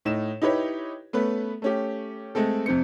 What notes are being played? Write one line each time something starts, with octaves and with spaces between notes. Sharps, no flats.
A2 D#4 E7
D#4 E4 G4 B4 C#5
A3 B3 C#4 B4
A3 C#4 G4
G#3 A3 C4 A4
F2 C3 C5 C#7